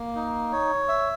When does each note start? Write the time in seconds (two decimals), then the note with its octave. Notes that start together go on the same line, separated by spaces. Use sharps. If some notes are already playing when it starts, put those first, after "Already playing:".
Already playing: A#3
0.15 D#4
0.52 C#5
0.88 E5